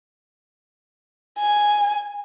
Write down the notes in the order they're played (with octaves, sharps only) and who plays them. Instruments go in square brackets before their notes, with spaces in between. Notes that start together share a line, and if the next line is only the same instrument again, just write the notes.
[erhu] G#5